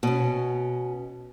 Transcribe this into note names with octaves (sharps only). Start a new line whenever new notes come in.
B2 C#4